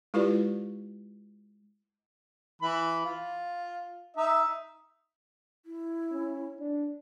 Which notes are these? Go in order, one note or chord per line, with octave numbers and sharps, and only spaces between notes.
G#3 E4 F4 G4 B4 D5
E3 B5
F4
D#4 E5
E4
C#4
D4